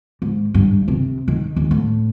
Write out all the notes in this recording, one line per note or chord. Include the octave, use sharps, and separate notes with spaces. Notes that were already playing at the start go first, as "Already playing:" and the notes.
G#2
G2
C3
D#3
D#2
A2